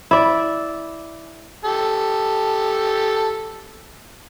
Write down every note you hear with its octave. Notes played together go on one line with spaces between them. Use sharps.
E4 D5
G4 A4